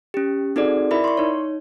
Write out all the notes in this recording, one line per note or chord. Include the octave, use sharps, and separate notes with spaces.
C#4 G4
C4 D#4 F#4 G#4 A4 D5
E4 A#4 D5 E5 B5
C6 C#6
D#4 C#5